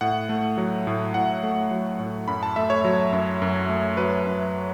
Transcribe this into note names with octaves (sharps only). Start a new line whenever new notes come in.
A2 F#5
A3
F#3
A2
A2 F#5
A3
F#3
A2
F#2 B5
A5
A3 E5
C#5
F#3
F#2
F#2
A3
F#3 B4
F#2